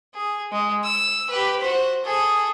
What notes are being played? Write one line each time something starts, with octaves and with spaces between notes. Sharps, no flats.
G#4
G#3
E6
G4 B4
F#4 C5
G#4 A4